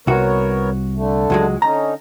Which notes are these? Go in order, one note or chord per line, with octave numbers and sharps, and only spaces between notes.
C2 B3 F#4 A#4 C#5
D3 A3
C#2 F#3 G#3
D3 C#4 D#4 A#5